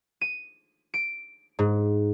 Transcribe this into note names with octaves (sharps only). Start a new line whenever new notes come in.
D#7
D7
G#2